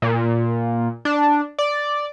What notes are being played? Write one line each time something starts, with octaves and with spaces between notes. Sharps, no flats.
A#2
D4
D5